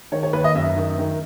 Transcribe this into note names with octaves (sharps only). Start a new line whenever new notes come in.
D#3 C#5
C#5
D#2 B4
D#5
F#2 E5
D#3
D#3